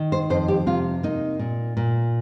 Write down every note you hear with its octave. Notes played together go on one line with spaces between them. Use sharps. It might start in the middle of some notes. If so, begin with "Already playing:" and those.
Already playing: D#3
C5
F2 C5
G4
C3 F4
A#3 D#4
A#2
A#2